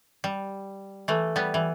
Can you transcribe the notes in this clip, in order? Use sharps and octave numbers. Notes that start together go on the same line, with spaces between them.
G3
E3 A3
G3 B3
E3